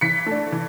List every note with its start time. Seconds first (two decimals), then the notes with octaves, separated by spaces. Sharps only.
0.01 E3 B6 C#7
0.26 A3 D4
0.52 E3